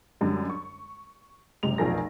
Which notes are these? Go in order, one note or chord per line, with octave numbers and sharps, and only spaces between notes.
F#2 D3 G3 G#3
C#6
F#1 C3 G#3 F7
F1 B1 F3 G#4 A#4 A#6